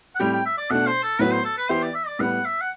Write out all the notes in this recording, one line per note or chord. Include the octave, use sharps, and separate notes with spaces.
F#5
A2 G3 C4 G4 G5
G5
E5
D5
B2 A3 D4 F#5
C5
A4
A2 F#3 B3 F#4 B4
C5
A4
B4
E3 B3 E4 G4 C5
D5
E5
D5
A2 G3 B3 F#5
E5
F#5